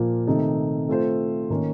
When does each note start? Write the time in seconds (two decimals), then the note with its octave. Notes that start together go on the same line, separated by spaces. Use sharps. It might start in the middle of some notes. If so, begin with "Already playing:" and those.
Already playing: A#2 F3 A#3
0.27 C3 D#3 A3 D#4 A4
0.89 A3 C4 F4 A4 C5
1.50 D#3 A#3 C#4